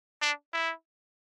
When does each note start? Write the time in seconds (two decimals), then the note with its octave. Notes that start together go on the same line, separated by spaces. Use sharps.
0.22 D4
0.53 E4